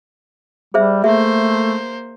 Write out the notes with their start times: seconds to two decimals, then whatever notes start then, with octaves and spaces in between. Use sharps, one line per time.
0.74 G3 G#4 C5 E5
1.04 A3 A#3 G#4 C5 E5